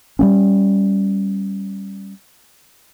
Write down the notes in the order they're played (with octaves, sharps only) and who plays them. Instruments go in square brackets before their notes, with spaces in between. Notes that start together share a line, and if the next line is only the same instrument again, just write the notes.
[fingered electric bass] G3 A#3 C#4